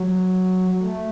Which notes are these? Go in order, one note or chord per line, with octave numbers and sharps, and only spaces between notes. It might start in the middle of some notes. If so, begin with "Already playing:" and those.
Already playing: F#3
A3